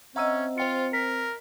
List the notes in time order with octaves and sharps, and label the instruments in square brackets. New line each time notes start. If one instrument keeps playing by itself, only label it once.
[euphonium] C4 [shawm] C#4 [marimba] D#5 F#5 [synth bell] E5 A#5 E6
[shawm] F4 [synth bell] C5 G5 C#7
[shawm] A#4 [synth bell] B6